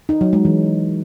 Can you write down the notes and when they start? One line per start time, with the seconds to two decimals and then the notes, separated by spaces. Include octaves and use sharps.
0.09 D#4
0.21 F#3
0.33 G#3
0.45 E3